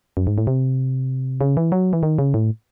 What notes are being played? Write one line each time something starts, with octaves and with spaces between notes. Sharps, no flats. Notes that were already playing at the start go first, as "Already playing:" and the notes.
F#2
G#2
A2
C3
C#3
E3
F#3
E3
D#3
C#3
A2